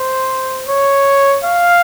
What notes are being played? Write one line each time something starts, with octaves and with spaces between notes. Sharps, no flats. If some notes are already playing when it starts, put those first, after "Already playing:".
Already playing: C5
C#5
F5